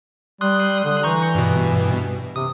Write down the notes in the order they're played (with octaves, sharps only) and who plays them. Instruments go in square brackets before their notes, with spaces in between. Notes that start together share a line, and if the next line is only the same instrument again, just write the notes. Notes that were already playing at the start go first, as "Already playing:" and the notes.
[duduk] G3 [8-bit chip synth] C6 D#6 F#6
[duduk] D3
[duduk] E3 [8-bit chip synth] A#5 C#6 G6
[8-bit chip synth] G2 B2
[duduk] C3 [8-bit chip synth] D#6